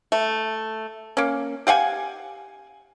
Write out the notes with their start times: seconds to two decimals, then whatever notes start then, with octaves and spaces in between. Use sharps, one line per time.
0.12 A3
1.17 A#3 C#4
1.67 G4 F5 F#5 G#5